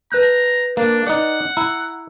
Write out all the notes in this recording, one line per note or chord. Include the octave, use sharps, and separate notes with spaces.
B4 A#5 F#6 G6
A#3 D4
D#4 D5 F#5
E4 A#5